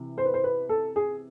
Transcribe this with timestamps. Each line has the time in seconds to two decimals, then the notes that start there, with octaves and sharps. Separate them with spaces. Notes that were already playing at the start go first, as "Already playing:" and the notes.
Already playing: C3 E3
0.18 C5
0.25 B4
0.34 C5
0.44 B4
0.69 A4
0.96 G#4